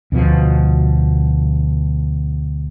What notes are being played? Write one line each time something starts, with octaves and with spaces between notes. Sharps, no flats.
D2 B2 F3